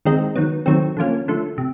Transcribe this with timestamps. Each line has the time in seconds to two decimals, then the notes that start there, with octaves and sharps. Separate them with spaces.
0.05 D#3 G#3 C4 D#4
0.36 D#3 F#3 B3
0.66 D#3 F#3 A3 C4
0.97 D3 F3 A#3 C#4
1.28 D3 F3 A3
1.58 C3